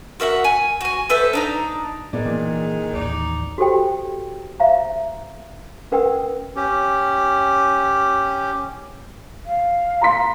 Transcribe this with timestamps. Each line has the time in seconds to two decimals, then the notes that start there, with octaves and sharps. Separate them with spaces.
0.20 F#4 A#4 E5 F#5
0.44 G#5
0.81 F#4 G#5
1.10 A4 B4 C5 E5
1.33 D4 D#4 A#5
2.13 A2 D#3 G#3 B3 G#4 D5
2.25 A#2 E3
2.93 A1 D#2 D#4 D5
3.58 F#4 G4 A4 C5 G5
4.60 C5 E5 F5 A#5
5.92 C#4 A#4 B4 F#5 G5 E6
6.56 C#4 G4
9.46 F5
10.01 A#5 C6 B6